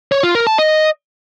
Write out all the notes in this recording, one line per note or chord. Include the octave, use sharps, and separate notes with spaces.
C#5
F4
A#4
A5
D#5